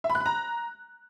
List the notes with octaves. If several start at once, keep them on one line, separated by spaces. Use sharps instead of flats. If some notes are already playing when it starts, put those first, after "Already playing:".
E5
B5
F#6
B5
A#5